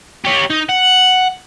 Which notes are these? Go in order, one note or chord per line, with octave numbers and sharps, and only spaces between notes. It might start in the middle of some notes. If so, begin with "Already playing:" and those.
G4 C#5
D#4
F#5